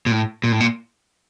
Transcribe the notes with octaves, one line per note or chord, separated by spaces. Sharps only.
A#2
A2
A#2
A2
A#2